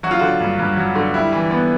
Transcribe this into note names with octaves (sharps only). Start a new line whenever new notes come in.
F#3 F#4
F4
D3 F#4
G2
G2
F#3
D3
G3 E4
E3
B3